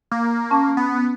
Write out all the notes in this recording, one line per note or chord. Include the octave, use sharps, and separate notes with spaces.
A#3
C#4 A5 C#6
B3